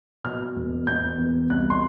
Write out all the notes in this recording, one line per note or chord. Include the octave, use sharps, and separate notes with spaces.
B2 F6
E1
E1 G6
E2
C2 F#6
C6